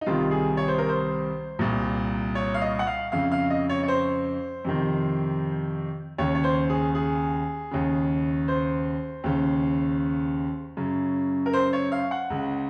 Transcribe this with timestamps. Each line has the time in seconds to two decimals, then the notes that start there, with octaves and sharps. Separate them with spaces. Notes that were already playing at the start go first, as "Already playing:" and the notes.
0.01 D#4
0.06 C2 C3 D#3 F4
0.31 G#4
0.57 C#5
0.68 C5
0.78 A#4
0.89 C5
1.59 C2 A#2
2.35 C#5
2.54 F5
2.61 D#5
2.79 F#5
2.87 F5
3.12 F2 C#3 F5
3.32 F5
3.50 D#5
3.69 C#5
3.83 C#5
3.88 C5
4.65 F2 C3 D#3
6.18 D#2 C#3 C#5
6.35 C#5
6.44 C5
6.70 G#4
6.95 G#4
7.71 D#2 C#3
8.48 C5
9.24 D#2 C#3
10.77 F#2 C#3
11.46 A#4
11.53 C5
11.73 C#5
11.92 F5
12.11 F#5
12.30 C#2 C#3